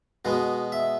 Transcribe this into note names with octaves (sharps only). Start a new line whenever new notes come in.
B2 G#3 B3 F#4
E5